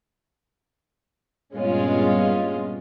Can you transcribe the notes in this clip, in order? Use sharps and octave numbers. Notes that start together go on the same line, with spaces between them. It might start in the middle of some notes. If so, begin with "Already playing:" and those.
G2 A#2 G#3 B3 C#4 F4